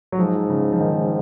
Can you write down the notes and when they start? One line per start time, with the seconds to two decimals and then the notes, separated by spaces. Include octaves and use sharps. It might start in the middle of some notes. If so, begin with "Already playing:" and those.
0.12 F#3
0.19 G#2 F3
0.49 C#3
0.72 F3
0.80 D#3